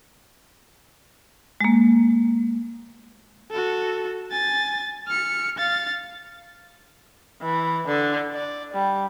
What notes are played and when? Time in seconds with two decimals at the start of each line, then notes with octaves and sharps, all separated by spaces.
1.61 G#3 A#3
3.51 F#4 A4
4.31 G#5 A6
5.07 F6 C#7
5.58 F5 A6
7.42 E3
7.87 D3
8.34 D5
8.73 G3